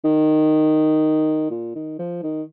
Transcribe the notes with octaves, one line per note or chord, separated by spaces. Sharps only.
D#3
A#2
D#3
F3
D#3